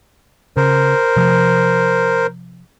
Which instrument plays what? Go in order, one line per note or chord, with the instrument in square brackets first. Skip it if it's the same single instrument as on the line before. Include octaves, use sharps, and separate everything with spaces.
[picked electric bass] C#3 [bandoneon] A#4 C5
[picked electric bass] C3 F3